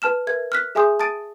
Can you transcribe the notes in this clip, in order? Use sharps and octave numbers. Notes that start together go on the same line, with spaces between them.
B4 A5 F6 E7
A#4 B4 E5 G#6
F6 F#6 B6
G#4 E5 G#5 C6 D#6 G6
A5 D#6 A6 D7 D#7